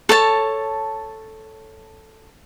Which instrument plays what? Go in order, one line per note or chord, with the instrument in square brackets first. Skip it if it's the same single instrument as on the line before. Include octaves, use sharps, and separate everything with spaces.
[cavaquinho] A4 C#5 A5